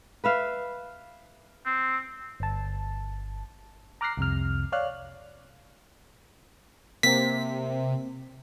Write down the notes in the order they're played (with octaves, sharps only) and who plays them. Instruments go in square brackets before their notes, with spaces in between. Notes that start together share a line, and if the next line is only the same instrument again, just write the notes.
[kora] B4 E5 F5
[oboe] C4
[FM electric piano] G1 A5
A#5 D6 F6 F#6 A#6 C7
C2 F2 C3 F6
C#5 D5 F5 F6 F#6
[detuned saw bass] C3 [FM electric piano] A#3 C4 [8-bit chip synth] B6